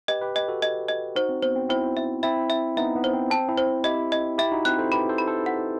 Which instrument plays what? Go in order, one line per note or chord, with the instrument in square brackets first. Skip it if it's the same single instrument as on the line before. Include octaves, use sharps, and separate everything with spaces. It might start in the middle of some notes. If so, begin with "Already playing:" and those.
[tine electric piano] G4 B4 [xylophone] D#5
[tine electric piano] G4 B4
[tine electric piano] G4 B4 [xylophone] D#5
[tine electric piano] F#4 A4
[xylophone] D#5
D#5
[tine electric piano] D#4 F#4 [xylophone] C5
[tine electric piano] C4
[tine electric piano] B3 [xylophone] C5
[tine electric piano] C4
[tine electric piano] C4 E4 [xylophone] C5
[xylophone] E5
[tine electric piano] C4 E4 [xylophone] E5
[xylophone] E5
[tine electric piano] B3 D#4 [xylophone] E5
[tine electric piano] B3
[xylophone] C5
[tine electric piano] C4
[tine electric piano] C4 [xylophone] A5
[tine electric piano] C4 E4
[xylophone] C5
[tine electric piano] E4 G4 [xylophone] D#5
[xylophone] D#5
[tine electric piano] E4 G4 [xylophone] E5
[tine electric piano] D#4 F#4
[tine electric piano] C4 E4 [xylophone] F#6
[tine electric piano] A4 C5
[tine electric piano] G4 B4 [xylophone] B5
[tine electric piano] A4 C5
[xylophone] B5
[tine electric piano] A4 C5
[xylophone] F#5